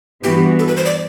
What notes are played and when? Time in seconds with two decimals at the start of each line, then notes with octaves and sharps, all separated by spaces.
0.24 G2 E3 B3 F#4 G4
0.59 A4
0.68 B4
0.77 C5
0.85 D5